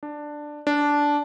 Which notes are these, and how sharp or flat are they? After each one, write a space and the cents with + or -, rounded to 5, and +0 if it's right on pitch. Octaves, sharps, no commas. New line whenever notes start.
D4 +10
D4 -10